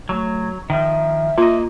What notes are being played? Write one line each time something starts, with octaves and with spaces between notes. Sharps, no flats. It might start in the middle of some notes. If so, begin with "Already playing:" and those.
F#3 A3
D#3 F3 E5
A#3 F4 D#5